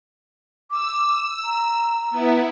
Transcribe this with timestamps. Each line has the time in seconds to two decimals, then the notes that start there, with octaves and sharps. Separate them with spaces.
0.71 D6 E6
1.44 A#5
2.11 B3 E4